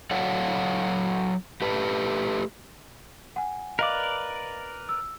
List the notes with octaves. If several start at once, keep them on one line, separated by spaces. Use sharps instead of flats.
F#3 A4 C#5 F5 F#5
A3 G4 B4
F#5 G#5
A#4 B4 D5 D#5 F5 D6
E6